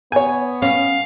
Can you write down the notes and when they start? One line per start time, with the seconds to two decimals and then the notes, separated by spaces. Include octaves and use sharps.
0.12 B3 C#5 G#5
0.62 C#4 F5